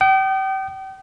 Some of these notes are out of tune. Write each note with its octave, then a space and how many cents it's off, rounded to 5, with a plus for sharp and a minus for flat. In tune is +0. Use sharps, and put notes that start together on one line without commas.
G5 -35 D#6 -30